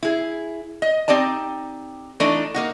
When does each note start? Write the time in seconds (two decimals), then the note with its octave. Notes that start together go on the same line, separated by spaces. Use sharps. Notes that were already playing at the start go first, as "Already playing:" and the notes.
0.03 E4 G#4
0.82 D#5
1.08 C4 D#4 G4 D5 A5
2.20 E3 A3 D4 D#4 A4
2.54 A#3 D#4 F#4